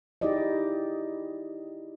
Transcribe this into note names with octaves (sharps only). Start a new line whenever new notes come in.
D#4 E4 G4 G#4 D5 D#5